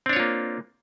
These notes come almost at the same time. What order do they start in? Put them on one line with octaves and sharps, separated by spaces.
C4 D4 C#5 F4 A#3